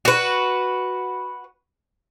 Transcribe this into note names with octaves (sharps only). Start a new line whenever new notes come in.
F#4 B4